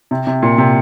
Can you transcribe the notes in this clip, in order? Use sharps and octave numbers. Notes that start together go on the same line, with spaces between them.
C3
C3
A#2
C3